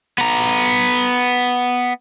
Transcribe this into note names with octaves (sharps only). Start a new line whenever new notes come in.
B3 A#5